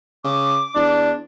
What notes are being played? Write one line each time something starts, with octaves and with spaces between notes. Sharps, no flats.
C#3 D6
E2 D4